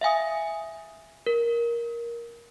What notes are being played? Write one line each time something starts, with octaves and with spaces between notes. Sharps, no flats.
E5 F5 G#5 D#6
A#4